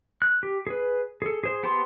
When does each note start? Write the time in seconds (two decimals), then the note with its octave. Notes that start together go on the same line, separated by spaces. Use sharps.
0.22 F#6
0.43 G4
0.67 G#4 B4
1.22 G#4 A4
1.44 G#4 C5
1.63 B3 G4 C5 A5 C6